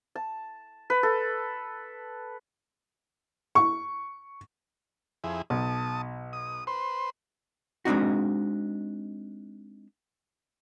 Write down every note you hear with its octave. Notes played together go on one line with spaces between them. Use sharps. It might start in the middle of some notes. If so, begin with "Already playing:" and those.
A5
B4
A4
C#6
F2 E4 G#4
B1 A5 D#6
D#6
B4 C5 C6
G#3 C4 D4 D#4 F#4